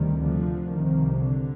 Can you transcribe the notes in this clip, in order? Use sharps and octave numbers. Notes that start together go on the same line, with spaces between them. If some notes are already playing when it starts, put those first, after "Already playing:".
Already playing: D2 C3 D#3 G3
D3 F3
C2 C3 D#3
D3